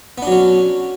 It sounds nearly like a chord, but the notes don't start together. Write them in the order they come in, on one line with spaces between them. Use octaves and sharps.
B3 D4 F#3 C#4